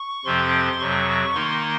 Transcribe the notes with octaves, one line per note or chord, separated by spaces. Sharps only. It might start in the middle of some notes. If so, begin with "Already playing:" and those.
Already playing: C#6
F2 C3 F3 C4 C6
F2 C3 F#3 C#6
D#3 A#3 D#4 C6